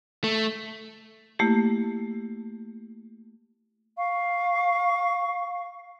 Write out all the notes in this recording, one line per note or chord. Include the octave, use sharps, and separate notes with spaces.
A3
A3 A#3 E4 G4
F5 C#6